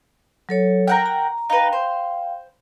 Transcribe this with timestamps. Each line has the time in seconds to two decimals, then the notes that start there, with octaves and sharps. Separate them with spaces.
0.49 F#3 A4 C#5
0.87 A#4 F#5 G5
1.06 A#5
1.50 D#4 B4 F5 G5
1.72 C5